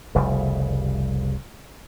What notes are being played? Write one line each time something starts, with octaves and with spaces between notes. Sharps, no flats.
F1 C2 C#3 G3